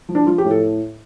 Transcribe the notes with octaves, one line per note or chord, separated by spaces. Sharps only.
F3
D4
F3 F4
G4
A2
A4